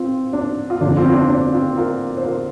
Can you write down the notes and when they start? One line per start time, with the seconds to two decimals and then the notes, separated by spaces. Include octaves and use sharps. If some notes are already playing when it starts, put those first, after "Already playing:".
Already playing: C4 F4
0.33 D4
0.70 F4
0.81 G1 F2 C3 F3 D4
0.97 C4 F4
1.09 F4
1.13 D4
1.29 D4
1.53 C4 F4
1.77 F4 A#4
2.17 C5
2.25 F4 A#4